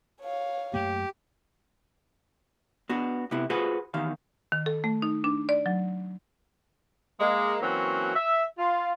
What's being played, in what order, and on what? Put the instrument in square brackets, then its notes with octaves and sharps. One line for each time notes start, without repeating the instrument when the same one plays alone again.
[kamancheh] C#5 F5
[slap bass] F#2 A3 A#3 [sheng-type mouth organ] G4
[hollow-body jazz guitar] B3 D4 F#4
C3 B3 E4
F4 F#4 G#4 B4 C5 F#5
E2 D#3 F5
[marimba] D#3
A4
A3
D#4
D4
D5
F#3
[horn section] G#3 A#3
E3 F#3 A#3 C4 C#4 F#4
E5
F4